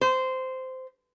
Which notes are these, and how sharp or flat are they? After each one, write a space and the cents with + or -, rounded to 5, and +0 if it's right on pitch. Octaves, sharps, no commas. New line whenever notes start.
C5 -15